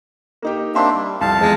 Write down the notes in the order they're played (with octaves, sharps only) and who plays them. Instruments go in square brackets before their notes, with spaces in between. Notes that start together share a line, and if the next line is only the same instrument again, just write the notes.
[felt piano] A#3 D#4 G4
[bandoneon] A#3 C4 D4 [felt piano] E5 C6
[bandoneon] G3
[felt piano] C2 [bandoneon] F2 F5 A5
[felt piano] E2 [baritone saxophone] G#3